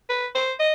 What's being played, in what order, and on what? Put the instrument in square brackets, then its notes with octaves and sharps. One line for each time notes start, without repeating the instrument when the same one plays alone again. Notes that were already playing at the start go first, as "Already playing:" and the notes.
[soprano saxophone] B4
C5
D#5